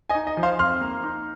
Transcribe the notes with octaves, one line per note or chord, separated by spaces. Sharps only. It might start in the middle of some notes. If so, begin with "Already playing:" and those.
D#5 G#5
D#4
D#5
F3
C5 F5
F2 C6 F6
A#3
D#4